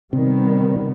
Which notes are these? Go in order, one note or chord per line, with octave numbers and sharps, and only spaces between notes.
C3 D#3 G3 B3 C4